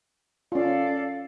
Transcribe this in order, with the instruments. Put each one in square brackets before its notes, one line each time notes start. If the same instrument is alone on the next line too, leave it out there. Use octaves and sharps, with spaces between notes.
[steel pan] C#4 F4 [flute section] A4 D5 F5